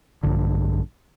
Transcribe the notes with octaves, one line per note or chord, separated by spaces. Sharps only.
A#1 G2 D3